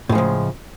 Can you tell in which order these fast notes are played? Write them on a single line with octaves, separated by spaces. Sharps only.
A2 G#3 F3 C#3